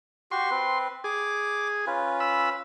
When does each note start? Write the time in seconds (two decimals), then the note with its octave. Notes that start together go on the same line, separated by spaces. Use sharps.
0.32 F#4 G4 C6 C#6
0.51 C4 B4
1.04 G#4 D6
1.87 C#4 F4 B4
2.20 B5 E6